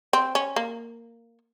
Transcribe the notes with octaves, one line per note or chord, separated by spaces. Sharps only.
C4
C#4
A#3